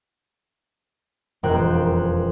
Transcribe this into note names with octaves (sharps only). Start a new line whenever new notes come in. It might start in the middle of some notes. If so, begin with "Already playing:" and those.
E1 F2 A#4 G5 F#6